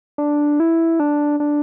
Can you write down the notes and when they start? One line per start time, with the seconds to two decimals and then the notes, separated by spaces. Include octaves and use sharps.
0.18 D4
0.60 E4
1.00 D4
1.40 D4